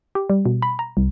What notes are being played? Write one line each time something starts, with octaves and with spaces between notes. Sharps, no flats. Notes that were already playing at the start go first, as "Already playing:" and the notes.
G4
G3
B2
B5
A#5
C2